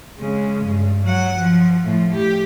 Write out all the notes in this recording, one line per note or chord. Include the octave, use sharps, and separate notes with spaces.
C#3 G#3
G2
F#3 F#5
F3
A2 F3
G4